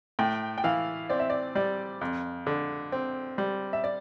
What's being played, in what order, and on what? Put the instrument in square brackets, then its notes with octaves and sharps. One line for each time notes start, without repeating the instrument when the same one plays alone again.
[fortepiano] A2 [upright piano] G5
[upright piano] G5
[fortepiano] E3 [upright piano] F5
[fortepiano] C4 [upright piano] D5
[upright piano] E5
D5
[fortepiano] G3 [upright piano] D5
[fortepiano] F2
D3
C4
G3
[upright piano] E5
D5